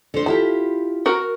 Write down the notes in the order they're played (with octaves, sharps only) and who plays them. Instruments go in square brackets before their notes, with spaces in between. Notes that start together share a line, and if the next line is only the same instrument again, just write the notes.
[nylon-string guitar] D3 C5
[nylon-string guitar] E4 F4 G4 [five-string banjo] A5
[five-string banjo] F#4 A#4